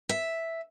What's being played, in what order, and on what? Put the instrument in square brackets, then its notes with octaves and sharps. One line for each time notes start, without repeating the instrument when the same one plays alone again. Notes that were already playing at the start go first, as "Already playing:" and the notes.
[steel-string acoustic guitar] E5